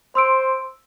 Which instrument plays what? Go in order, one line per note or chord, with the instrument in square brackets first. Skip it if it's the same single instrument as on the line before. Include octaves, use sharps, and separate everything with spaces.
[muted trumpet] C5 [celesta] C6 E6 D7